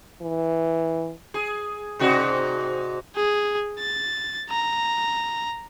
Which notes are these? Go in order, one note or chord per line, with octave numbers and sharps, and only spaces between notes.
E3
G#4
G#2 C3 F#4
G#4
A6
A#5